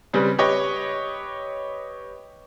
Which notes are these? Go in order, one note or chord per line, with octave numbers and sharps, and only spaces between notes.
C#3 G3 C4 B4
G4 B4 C#5 D#5